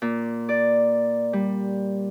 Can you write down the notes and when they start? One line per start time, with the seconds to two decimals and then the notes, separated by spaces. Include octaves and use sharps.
0.02 A#2
0.49 D5
1.33 G3